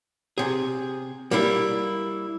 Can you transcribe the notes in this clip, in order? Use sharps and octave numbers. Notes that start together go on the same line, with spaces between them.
C3 G#4
G3 A#3 D4 E4